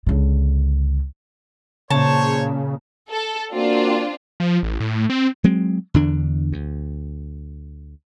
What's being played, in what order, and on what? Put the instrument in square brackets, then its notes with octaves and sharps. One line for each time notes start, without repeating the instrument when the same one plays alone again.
[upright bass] C#2 D3
[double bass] A#2 [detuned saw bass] C#3 [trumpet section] C5 C#5 [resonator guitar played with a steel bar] A5
[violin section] A4
[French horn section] A#3 F#4 [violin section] C4 D4 F4
[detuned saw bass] F3
A1
A2
C4
[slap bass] F#3 G#3 C4
E2 D3 D4
D2